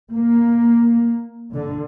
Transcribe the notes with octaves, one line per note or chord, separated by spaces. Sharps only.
A#3
D3